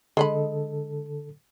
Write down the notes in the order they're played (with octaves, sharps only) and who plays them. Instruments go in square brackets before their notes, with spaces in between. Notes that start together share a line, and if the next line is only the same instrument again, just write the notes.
[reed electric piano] D3 A4 [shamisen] G#3 D#5 B5